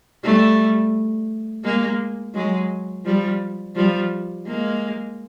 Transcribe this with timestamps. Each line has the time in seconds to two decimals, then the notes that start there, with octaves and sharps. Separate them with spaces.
0.23 G3 A3
1.64 G#3 A#3
2.35 F#3 G#3
3.05 F3 G3
3.76 F3 G3
4.47 G#3 A#3